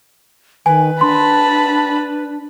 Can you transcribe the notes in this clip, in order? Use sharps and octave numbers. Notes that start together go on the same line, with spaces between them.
D#3 B4 G#5
D4 A5 B5 C6